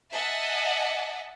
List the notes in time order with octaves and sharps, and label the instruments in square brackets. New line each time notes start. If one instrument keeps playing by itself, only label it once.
[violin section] D#5 E5 F#5 G#5 A5